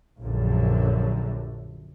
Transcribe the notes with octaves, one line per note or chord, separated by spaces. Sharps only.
A#1 F#2 D3